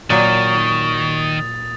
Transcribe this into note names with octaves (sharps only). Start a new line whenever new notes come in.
A#2 D#3 F#3 C#6 D#6 A6